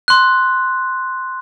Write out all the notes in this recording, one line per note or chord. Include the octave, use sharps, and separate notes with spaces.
C6 F#6